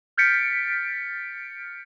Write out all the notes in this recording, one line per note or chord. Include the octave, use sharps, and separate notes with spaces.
F6 G6 A6 B6 C#7 D7